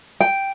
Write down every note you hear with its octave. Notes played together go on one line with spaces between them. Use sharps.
G5